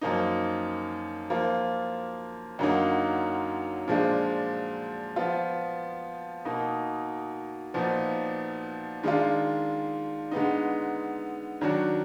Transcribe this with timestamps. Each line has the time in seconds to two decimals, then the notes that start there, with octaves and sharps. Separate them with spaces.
0.01 F#2 F3 A#3 D#4
1.30 F3 A#3 F4
2.59 F#2 D3 F#3 A#3 D#4
3.88 A#2 F3 G#3 D4 F4
5.16 F3 B3 F4
6.45 B2 A#3 D#4
7.74 A#2 F3 B3 D#4
9.03 D#3 G#3 D4 F4
10.31 D3 G#3 B3 D#4
11.61 D#3 F#3 D4 F#4